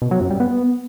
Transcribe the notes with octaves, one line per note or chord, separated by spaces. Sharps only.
B2
F#3
F#2
G3
B3